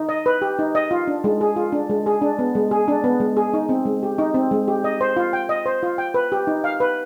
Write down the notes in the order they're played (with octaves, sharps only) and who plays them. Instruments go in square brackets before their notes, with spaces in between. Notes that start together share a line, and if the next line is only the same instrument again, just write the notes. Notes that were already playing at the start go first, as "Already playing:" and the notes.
Already playing: [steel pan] D#4
D#5
B4
G4
D#4
D#5
F4
D4
G#3
G#4
F4
D4
G#3
G#4
D4
B3
G#3
G#4
D4
B3
G#3
G#4
D#4
C4
G#3
G4
D#4
C4
G#3
G4
D#5
C5
F4
G5
D#5
C5
F4
G5
B4
G4
D#4
F5
B4